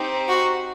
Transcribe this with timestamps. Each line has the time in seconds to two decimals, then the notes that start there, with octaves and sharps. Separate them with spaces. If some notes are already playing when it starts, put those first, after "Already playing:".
Already playing: C4 D#4 G4
0.28 F#4